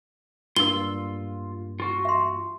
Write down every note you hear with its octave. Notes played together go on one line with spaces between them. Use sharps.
G2 A#3 F4 E6 G7
F4 F#4
E5 C6